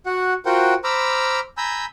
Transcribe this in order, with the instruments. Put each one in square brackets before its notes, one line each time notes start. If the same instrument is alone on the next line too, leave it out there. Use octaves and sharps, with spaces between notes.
[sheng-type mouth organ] F#4 F#5
F4 F#4 A#4 C5 F#5 G5
C5 A#5 B5 D6 E6 F6
G#5 A#5 B5 E6 G6